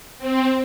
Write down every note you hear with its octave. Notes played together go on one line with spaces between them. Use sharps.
C4